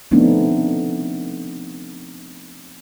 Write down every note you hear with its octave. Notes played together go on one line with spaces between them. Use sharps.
F3 A3 B3 C4 D4 D#4